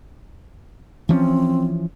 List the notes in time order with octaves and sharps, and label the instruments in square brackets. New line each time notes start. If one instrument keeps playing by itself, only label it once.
[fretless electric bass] E3 F3 C#4 [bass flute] C4